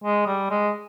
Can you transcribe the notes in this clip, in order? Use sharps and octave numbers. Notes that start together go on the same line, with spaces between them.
G#3
G3
G#3